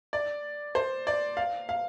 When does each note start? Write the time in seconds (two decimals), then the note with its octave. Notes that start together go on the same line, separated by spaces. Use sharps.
0.13 D5
0.75 C5
1.07 D5
1.37 F5
1.69 F5